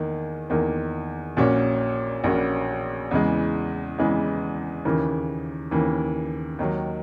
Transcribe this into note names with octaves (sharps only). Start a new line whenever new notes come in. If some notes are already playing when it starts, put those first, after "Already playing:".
Already playing: E2 D#3 A#3
E2 D#3 A#3
A#1 A#2 A#3 C#4 F#4
A#1 A#2 A#3 C#4 F#4
E2 C#3 E3 G#3
E2 C#3 E3 G#3
D#2 C#3 E3 A#3
D#2 C#3 E3 A#3
D#2 D#3 F#3